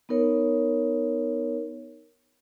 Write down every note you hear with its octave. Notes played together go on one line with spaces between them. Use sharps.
B3 D#4 A#4 C#5